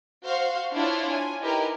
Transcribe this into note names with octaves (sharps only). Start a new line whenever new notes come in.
F#4 C5 F5
D4 E4 F4 C#5 F5
G#5
D#4 E4 G4 A#4 B4